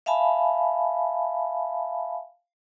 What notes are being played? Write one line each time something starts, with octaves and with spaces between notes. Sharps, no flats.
E5 F5 G#5 A5 B5